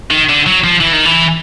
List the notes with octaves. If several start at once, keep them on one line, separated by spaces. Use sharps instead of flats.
D#3
D3
F#3
F3
E3
D#3
E3